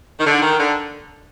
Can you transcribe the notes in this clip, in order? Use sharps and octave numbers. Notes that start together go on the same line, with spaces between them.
D#3
D3
D#3
D3